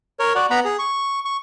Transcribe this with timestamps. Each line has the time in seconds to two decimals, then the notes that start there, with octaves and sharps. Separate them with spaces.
0.20 A#4 C#5
0.35 F#4 D5 F#5
0.50 B3 F#5 A#5 B5
0.65 G#4
0.79 C#6
1.25 C#6